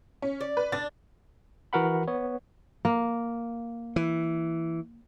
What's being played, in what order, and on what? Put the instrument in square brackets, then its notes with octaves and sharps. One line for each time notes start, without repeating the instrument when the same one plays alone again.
[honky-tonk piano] C#4
[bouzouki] D5
[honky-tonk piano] B4
[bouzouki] D4 [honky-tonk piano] A6
[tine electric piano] E3 F#4 A#4 F#5 B5
B3 C#5
[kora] A#3
[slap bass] E3